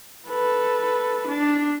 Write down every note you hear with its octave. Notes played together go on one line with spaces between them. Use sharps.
A4 B4
D4